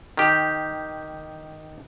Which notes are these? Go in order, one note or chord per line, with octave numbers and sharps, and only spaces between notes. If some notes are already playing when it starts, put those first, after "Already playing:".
D#3 G4